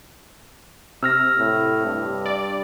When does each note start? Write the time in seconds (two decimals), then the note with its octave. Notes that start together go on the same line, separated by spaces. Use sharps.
1.03 C3 E6 F6 A#6
1.39 A2
1.86 G2
2.26 D5